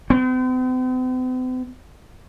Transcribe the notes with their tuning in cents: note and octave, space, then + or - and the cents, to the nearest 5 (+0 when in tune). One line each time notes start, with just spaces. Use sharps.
C4 -45